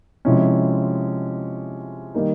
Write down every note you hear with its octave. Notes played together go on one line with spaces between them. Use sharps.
C3 F3 G#3 C#4 E4
D#3 G3 A#3 D#4